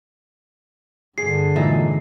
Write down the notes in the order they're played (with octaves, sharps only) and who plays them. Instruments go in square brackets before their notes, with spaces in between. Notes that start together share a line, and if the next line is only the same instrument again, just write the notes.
[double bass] G2 D3 [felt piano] G#4 [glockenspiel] C7
[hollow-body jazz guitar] A#2 E3 E5 [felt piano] F#3 G#3 D#4